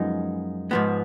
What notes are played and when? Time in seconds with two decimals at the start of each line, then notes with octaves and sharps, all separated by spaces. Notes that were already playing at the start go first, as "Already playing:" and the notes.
Already playing: F#2 F3 G#3 B3 D#4
0.71 G#2 F3 B3